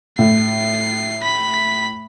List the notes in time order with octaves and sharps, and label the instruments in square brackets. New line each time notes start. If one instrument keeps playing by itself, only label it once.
[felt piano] A2 [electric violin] C7
[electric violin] B5 B6